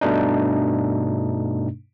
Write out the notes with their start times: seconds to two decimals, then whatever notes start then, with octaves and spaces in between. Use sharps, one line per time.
0.01 G2 B2 A3 D4 D#4